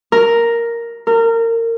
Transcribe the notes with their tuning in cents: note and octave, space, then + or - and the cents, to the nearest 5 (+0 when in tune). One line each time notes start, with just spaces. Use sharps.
A#4 +0
A#4 -25